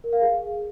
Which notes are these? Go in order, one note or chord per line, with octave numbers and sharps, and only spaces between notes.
A#4
F5
G#4